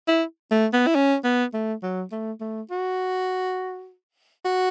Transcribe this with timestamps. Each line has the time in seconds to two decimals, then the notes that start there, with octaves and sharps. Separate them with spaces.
0.08 E4
0.51 A3
0.73 B3
0.87 E4
0.95 C#4
1.24 B3
1.54 A3
1.83 F#3
2.12 A3
2.41 A3
2.71 F#4
4.45 F#4